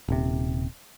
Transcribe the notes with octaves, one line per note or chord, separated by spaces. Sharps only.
D#1 C3